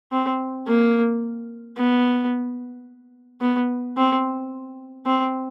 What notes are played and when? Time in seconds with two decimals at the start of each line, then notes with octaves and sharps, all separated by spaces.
0.12 C4
0.67 A#3
1.77 B3
3.41 B3
3.97 C4
5.06 C4